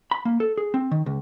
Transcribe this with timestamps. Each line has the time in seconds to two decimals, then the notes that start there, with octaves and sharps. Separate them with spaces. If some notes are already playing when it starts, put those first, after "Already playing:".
0.11 B5
0.25 A#3
0.40 A4
0.57 G#4
0.74 C4
0.91 D#3
1.06 C#2